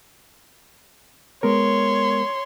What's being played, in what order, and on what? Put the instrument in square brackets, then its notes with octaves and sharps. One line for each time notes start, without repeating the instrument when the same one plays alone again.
[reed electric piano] G#3 B3 A#4 [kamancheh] C#5 C6